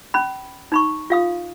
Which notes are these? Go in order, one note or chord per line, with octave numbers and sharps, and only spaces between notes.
C#4 B5
D#4 B5 C#6
F4 F5 D#6